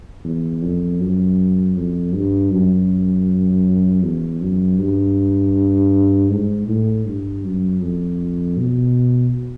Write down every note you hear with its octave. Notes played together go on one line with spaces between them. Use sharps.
E2
F2
F#2
F2
G2
F#2
E2
F#2
G2
G#2
A2
G2
F#2
F2
B2